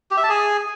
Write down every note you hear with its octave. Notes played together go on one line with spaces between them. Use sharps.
G4
E5
A5
G#4